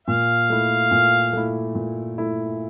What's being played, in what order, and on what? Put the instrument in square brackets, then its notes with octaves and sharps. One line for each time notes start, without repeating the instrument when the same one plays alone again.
[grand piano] A#2 [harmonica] F5
[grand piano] A3 E4
A#2
A3 E4
A#2
A3 E4